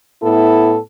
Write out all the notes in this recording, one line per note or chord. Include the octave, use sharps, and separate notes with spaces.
A2 B3 E4 A4